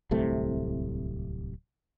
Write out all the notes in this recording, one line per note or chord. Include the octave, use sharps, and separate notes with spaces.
D1 C2 C3 A3